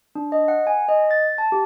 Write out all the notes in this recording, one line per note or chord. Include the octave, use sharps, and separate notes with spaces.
D4
D#5
F#5
G#5
D#5
A6
A5
G4